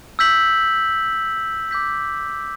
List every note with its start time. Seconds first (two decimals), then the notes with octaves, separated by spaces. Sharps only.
0.19 E6 G6 B6 F#7
1.71 D6 G6 B6